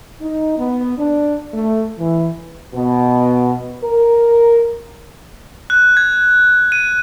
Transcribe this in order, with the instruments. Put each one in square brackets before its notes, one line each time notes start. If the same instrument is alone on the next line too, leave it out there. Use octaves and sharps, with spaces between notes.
[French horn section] D#4
B3
D4
A3
E3
B2
A#4
[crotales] F#6
G#6
D#7